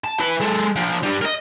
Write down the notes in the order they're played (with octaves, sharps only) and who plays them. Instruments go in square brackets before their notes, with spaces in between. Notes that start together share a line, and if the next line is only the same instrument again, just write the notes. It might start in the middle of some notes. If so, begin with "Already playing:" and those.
[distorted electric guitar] A5
E4 B4
G#3 A4
F3 D4
G2 G3
A#4 D#5